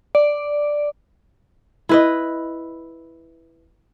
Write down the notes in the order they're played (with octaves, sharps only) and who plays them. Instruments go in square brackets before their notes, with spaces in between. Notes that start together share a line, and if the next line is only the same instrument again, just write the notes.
[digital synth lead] D5
[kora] E4 B4 D#5